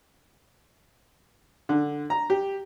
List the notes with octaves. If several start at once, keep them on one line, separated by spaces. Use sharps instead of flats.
D3
A#5
G4